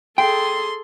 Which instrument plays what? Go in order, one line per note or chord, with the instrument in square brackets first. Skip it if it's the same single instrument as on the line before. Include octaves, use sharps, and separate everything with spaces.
[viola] G#4 A4 [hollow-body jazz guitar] G5 [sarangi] C6